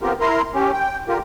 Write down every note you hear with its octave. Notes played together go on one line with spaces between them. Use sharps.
B3 C4 F4 G4 A#4
E4 A#4 A#5 C6
C#4 G4
G5
D3 F4 G4 A#4